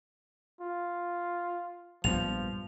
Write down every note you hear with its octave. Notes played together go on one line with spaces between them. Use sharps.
F4
A#1 G2 F3 B3 F7